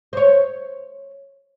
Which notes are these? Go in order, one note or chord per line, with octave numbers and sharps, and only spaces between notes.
C5 C#5